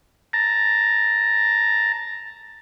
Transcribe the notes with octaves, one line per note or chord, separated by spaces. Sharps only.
A5 A#5